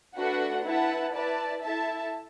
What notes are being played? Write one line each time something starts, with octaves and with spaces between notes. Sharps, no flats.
A3 D4 F#4 B4 F#5
E4 B4 F#5 A5
E4 B4 D5 A5
E4 A4 E5 A5